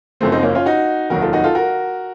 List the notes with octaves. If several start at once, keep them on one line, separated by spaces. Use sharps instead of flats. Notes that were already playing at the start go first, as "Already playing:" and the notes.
F#1 F#2 F3 A3 C4
C4 D#4
A#3 C#4
C#4 F4
D#4 F#4
F1 D#2 D#3 F#3 F#4 A#4
F4 A4
D#4 F#4
F4 A4
F#4 A#4